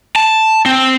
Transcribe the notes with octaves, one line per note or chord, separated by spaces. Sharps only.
A5
C4